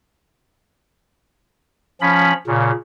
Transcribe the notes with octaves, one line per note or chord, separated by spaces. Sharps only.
F3 C#4 B5
A#2 C#3